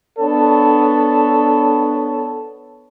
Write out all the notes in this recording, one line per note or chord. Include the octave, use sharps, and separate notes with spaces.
B3 D4 A4 C#5